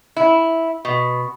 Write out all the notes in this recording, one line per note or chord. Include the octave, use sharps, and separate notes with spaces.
E4
B2